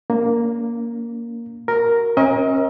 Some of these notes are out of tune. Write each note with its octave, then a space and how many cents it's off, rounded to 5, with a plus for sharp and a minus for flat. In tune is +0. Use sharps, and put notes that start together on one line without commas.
A#3 +0 C#4 +40
F#4 -5 A#4 +0
C#4 -35 A#4 +25 D#5 +35